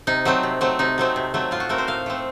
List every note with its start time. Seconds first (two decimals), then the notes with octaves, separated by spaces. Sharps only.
0.07 C3 D#4
0.25 F#3 A3 C4
0.43 C3
0.61 F#3 A3 C4
0.79 C3 D#4
0.98 F#3 A3 C4
1.16 C3
1.34 F#3 A3 C4
1.51 A2 F4
1.60 F#4
1.69 A3 C4 A#4
1.78 C5
1.88 A2 F5
2.06 A3 C4